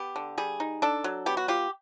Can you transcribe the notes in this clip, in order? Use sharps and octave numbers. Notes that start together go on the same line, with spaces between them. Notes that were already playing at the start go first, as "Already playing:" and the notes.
Already playing: B3 G4
D3
G3 G#4
D#4
D4 A4
F#3
B3 G4
F#4
F4 G4